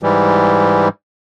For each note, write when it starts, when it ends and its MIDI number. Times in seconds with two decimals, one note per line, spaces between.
0.03 0.88 44
0.03 0.88 52
0.03 0.88 55